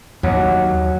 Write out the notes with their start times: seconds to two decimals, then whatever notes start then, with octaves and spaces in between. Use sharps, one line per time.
0.23 D#2 F#3